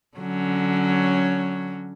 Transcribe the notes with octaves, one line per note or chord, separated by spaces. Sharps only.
D3 F#3 C#4